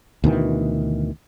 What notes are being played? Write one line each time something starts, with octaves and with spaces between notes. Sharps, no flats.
D2 B2 D#3 E3